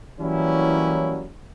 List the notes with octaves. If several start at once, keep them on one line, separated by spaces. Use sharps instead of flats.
E3 F#3 G3 A#3 C#4 E4